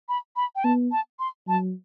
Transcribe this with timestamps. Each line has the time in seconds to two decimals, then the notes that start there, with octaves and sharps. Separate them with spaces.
0.09 B5
0.36 B5
0.56 G5
0.64 B3 A5
0.92 A5
1.19 C6
1.47 F#3 A5